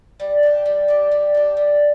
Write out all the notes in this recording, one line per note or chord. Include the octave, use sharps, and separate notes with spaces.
G3
D4 G4
G3
D4 G4
G3
D4 G4
G3